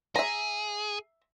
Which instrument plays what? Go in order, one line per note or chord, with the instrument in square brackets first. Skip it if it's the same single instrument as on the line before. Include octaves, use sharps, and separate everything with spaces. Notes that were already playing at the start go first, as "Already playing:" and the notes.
[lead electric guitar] G#4 [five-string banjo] E5 A#5